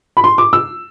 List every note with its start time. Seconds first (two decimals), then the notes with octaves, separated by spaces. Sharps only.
0.17 B5
0.24 C6
0.38 D6
0.53 E6